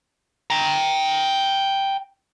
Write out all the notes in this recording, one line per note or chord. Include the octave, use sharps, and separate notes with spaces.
G5 A#5